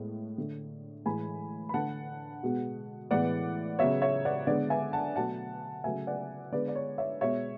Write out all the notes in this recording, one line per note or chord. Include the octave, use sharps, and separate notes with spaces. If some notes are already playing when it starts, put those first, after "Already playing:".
Already playing: A2 G#3 B3
D3 A3
A2 E3 G#3 G#5 B5
B5
D3 A3 F#5 A5
B2 G#3 B3
A2 E3 G#3 B3 D5 F#5
C#3 F#3 B3 C#5 E5
C#5 E5
D5 F#5
D3 G#3 B3 D5 F#5
E5 G#5
F#5 A5
B2 F#3 A3 F#5 A5
C#3 F#3 A3 E5 G#5
D5 F#5
D3 G#3 B3 B4 D5
D5
C#5
C#5 E5
B2 G#3 B3 C#5 E5